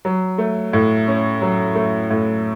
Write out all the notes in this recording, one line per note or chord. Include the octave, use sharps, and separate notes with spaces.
F#3
A3
A2
C#4
F#3
A3
A2